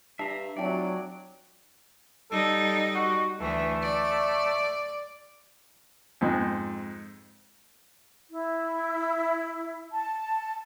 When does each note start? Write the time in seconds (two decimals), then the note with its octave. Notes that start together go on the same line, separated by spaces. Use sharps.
0.19 G2 E5 A5 A#5 C7
0.57 F1 F#3 D5 E5 G5 A5
2.31 G3 D#4 A4
2.95 F#4
3.40 D2 E3 A3
3.83 D5
6.21 F2 G#2
8.30 E4
9.92 A5